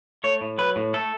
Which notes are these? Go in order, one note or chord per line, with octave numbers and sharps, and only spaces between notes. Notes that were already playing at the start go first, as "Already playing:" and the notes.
A3 C#5
A2
F#3 B4
A2
A3 A4